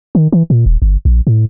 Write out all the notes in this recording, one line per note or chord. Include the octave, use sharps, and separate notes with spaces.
D#3
E3
A#2
D#1
G1
A#1
A2